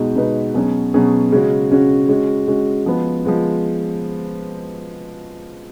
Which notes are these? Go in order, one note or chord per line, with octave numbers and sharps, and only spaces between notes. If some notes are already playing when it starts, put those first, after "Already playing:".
Already playing: B2 G#3 D#4 F#4
B2 G#3 D#4 F#4 B4
B2 F#3 C#4 G#4
B2 F#3 C#4 G#4
C#3 G#3 C#4 F#4
C#3 G#3 C#4 F#4
G#3 C#4 F#4
G#3 C#4 F#4
F3 G#3 B3
F3 G#3 B3